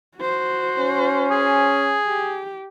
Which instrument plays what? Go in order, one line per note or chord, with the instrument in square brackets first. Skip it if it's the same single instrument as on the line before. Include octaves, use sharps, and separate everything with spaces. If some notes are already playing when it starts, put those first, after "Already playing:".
[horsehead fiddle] F#4 C5
[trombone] C#4
[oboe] G#4
[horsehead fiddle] G4